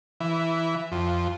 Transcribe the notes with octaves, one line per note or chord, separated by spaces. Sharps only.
E3
F2